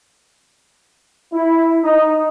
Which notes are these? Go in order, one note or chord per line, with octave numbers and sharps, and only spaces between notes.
E4
D#4